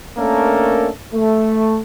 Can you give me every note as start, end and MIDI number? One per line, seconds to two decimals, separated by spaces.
0.17 0.89 57
0.17 0.89 58
0.17 0.89 61
0.17 0.89 62
0.17 0.89 69
0.17 0.89 70
1.14 1.80 57